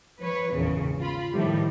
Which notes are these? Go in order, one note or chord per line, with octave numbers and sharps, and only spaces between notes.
F3 B4 C#5
G#1 E2 A#2 C#3
F4 B5
A2 D#3 F3 G3